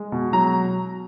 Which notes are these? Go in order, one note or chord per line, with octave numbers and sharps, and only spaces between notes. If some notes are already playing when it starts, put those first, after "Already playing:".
Already playing: G#3
B2
F#3 A#5